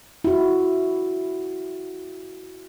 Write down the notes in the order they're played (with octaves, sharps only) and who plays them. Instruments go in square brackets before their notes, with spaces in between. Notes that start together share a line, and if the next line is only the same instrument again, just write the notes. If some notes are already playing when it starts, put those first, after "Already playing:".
[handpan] E4 F#4